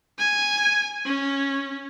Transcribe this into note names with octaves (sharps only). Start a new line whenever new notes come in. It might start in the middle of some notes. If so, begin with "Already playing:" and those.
G#5
C#4